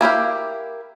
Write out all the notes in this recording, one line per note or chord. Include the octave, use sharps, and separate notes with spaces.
A#3 E4 G4 F5